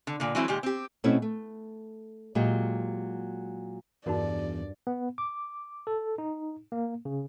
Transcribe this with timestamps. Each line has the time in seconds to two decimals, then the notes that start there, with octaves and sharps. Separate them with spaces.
0.07 D3
0.20 A#2 D3
0.35 E3 F#3 G#3 C4 E4
0.48 A#2 D#3 G#3 G4
0.63 C4 G4
1.04 B2 A3 C4 C#4 E4
1.22 A3
2.35 A#2 F#3 G#3 G4
4.06 E2 G2 D#4 F#4 A#4 D5
4.87 B3
5.18 D6
5.87 A4
6.18 D#4
6.72 A#3
7.05 C#3